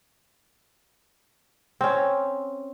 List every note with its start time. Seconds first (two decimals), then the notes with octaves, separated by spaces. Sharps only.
1.81 C4 C#4